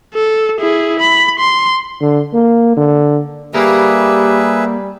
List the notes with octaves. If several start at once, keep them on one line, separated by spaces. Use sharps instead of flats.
A4
E4 G#4
B5
C6
D3
A#3
D3
G3 A#3 G4 G#4 A#4 B4 E5